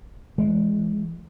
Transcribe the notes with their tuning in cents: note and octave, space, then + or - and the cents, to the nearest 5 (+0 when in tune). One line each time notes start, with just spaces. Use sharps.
E3 +25 G#3 +10